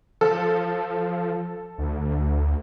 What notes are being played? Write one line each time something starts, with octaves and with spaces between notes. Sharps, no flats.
F3 A4
D2